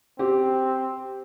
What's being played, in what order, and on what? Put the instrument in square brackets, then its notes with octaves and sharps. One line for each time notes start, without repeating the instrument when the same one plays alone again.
[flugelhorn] C4 [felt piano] G4